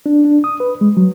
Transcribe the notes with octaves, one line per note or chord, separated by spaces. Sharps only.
D4
D4
D#6
B4
G#3
F#3